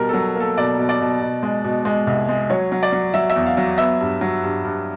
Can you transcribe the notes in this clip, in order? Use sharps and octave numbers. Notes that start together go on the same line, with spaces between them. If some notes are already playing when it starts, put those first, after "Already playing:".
Already playing: B2 G3 A#4
F#3 A4
A#3 A4
B2 D5
B2
D5
B2
B2
G#3
B2
G#3
C2
G#3
F#3 C#5
F#3
D5
F#3
F#3 E5
E5
E2
F5
F#3
B3 E5
G2
F#3
G2
G2